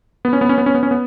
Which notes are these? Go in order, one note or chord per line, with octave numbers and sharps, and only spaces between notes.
B3
C#4
B3
C#4
B3
C#4
B3
C#4
B3